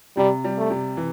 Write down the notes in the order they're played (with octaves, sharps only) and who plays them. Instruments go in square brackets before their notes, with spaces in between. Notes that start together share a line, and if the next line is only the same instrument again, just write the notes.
[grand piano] C3 [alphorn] G3
[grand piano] G3
[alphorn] A3
[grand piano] C3
E3